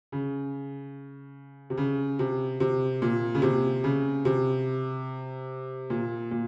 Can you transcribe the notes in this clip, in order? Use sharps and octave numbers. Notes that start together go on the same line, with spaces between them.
C#3
C3
C#3
C3
C3
A#2
C#3
C3
C#3
C3
A#2
A#2